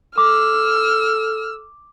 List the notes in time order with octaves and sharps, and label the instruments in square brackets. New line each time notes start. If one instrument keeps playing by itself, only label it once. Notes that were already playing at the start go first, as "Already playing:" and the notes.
[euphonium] A4 [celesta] D6 [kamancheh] E6 F6